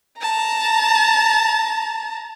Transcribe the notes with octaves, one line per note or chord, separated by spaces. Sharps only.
A5 A#5